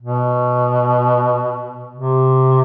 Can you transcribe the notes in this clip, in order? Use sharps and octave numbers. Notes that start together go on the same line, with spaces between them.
B2
C3